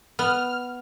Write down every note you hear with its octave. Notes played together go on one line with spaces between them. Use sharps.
B3 F6